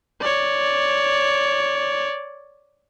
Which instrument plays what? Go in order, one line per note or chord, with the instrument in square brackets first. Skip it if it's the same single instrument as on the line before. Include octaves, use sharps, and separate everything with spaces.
[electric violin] C#5 D5